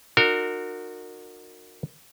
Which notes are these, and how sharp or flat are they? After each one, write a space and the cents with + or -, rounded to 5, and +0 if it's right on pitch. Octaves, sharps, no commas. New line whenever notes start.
D#4 -40 F#4 -20 A#4 -20